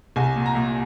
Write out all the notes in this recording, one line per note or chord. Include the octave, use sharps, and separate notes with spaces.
C2 G#5
A#2
A#5
A#2